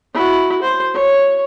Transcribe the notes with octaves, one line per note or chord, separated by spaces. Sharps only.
E4 F#4
C5
C#5